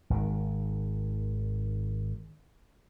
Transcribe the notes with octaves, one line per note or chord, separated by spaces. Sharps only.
G#1 D#3